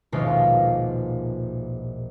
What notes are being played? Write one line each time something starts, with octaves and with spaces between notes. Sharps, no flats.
D#1 A#1 B2 G#3 F4 C7